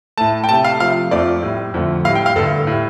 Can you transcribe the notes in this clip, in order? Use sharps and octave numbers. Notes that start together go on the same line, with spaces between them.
A2 A3 A5
G5
C3 A3 A5
F5
C3 F3 A3 F5
F2 F3 A3 D5
A2 G3
F2 D3 A3
A2 G3 F5
G5
F5
G2 D3 A3 A4
A2 G3